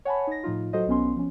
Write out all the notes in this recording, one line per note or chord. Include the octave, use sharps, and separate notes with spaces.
C#5 F#5 G#5 A5 B5
D#4 A#6
A2 F3 D#4 F4
F#3 F#4 A4 C5 D#5
B1 B3 C#4 C6
F3 C#4